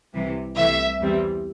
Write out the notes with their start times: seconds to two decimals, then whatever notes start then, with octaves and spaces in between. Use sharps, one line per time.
0.14 C2 C3 E3
0.56 C2 C3 E3 A3 E5
1.00 E2 E3 G3 C4